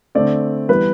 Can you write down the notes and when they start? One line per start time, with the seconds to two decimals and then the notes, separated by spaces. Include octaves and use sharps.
0.15 D3 A3 C4 D5
0.69 E3 G3 B3 B4